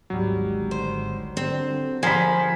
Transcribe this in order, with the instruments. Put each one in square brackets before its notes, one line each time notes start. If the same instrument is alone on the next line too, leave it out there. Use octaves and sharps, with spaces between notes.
[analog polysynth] G#1 D2 G#2 [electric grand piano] F#3 G3
[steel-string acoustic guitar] C5
[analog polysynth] D3 [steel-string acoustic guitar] C4
[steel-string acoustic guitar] F3 [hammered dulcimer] G#5 A#5 B5